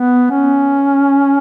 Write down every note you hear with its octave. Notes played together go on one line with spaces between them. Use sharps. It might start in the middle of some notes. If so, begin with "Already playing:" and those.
Already playing: B3
C#4